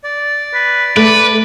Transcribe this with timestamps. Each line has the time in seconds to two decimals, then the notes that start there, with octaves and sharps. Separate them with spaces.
0.04 D5
0.54 B4
0.97 A3 B4 D6